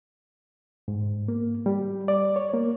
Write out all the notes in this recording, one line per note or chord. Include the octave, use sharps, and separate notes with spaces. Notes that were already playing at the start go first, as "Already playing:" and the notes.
G#2
A#3
G3
D5
C#5
A#3